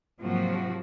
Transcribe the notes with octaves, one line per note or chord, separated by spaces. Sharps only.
G#2 C3 F3 F#3 A#3 F#4